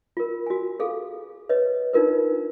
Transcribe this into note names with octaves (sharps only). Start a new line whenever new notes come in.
F4 A#4
F#4 G#5
G#4 A4 F5
B4 C#5 D#5
D4 D#4 F4 A#4 B4